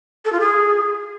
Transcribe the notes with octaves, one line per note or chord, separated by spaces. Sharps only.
A4
F4
G#4